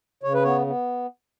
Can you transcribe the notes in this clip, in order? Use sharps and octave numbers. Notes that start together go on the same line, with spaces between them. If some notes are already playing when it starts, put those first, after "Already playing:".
C#3 C#5
B4
B3 C#5
B3